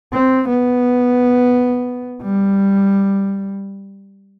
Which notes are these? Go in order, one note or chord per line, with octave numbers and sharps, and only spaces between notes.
C4
B3
G3